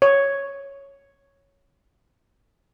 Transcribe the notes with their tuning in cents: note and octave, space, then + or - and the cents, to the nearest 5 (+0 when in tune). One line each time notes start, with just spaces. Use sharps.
C#5 +0